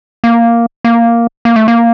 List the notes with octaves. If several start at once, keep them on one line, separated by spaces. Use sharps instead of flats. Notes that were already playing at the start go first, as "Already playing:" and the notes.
A#3
A#3
A#3
A3
A#3